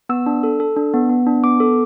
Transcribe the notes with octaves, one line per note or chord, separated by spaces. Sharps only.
B3 E6
D4
A4
A4
D4
B3
B3
D4
B3 D6
A4